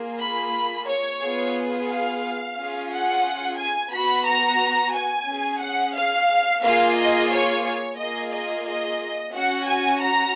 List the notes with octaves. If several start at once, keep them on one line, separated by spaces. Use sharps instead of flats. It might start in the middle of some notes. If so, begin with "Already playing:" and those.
Already playing: A#3 F4 G#4
B5
C#5
B3 F4 G#4
F5
C#4 F4 G#4
F#5
G#5
B3 F#4 B5
A#5
G#5
C#4 G#4
F#5
F5
A#3 F4 G#4 F5
D#5
C#5
C#5
A#3 F4 G#4 D#5
D#5
D#5
C#4 F#4 F#5
G#5
A#5